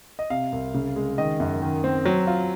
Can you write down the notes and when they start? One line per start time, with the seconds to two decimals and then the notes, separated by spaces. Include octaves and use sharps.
0.19 D#5
0.30 C3 F5
0.52 C2
0.74 C#3
0.96 G#3
1.18 D#3 D#5
1.40 F#2
1.62 D#3
1.84 C4
2.05 F#3
2.27 F4